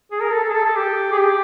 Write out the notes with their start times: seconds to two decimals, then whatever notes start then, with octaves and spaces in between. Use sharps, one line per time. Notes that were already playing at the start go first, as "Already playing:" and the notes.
0.11 G#4
0.21 A#4
0.33 A4
0.44 A4
0.49 G#4
0.54 A4
0.65 A4
0.76 G4
1.12 G#4
1.19 G4